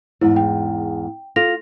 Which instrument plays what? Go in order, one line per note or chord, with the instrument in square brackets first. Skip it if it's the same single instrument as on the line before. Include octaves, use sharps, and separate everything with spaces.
[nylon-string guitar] E2 G#2 [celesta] E4
[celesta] G5
[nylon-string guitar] F4 [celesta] A4 A#6 F7